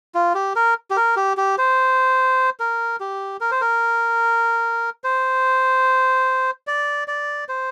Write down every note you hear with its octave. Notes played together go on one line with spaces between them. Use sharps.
F4
G4
A#4
G4
A#4
G4
G4
C5
A#4
G4
A#4
C5
A#4
C5
D5
D5
C5